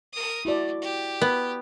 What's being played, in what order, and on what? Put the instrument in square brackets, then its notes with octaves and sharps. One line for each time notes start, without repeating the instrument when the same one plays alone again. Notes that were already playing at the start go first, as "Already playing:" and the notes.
[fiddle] A#4 D#6
[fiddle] A3 [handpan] E4 F#4 D5
[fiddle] G4
[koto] B3